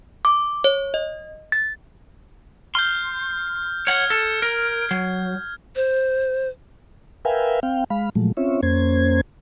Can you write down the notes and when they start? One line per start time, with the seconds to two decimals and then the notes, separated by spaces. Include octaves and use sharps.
0.25 D6
0.64 C#5
0.94 D#5
1.52 A6
2.75 C6 F6 G6
3.87 C#5 F#5 F6 G#6
4.10 A4
4.42 A#4
4.91 F#3
5.76 C5
7.25 A#4 B4 E5 F5 G5 G#5
7.63 C4 F5 G5
7.90 G#3 F5 B5
8.15 A#2 F3 F#3 G#3 A3
8.37 C4 C#4 F4 C#5 E5
8.63 F2 A#3 C#4 C5 G#6